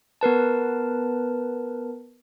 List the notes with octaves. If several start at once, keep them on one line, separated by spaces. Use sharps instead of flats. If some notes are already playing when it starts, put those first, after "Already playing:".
B3 A#4 B4 A5